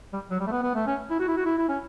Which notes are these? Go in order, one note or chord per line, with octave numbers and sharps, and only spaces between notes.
G3
F#3
G3
A3
B3
B3
A3
C#4
E4
F#4
E4
F#4
E4
E4
C#4